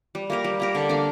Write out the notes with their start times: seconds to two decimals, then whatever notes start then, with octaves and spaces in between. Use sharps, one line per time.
0.15 G3
0.30 A#3 G4 A#4
0.44 G3
0.60 A#3 G4 A#4
0.75 D3
0.89 A#3 D4